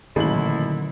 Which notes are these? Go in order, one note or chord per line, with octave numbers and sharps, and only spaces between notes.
A1 A#2 D3 D#3 F#3 A#3 E4 F#7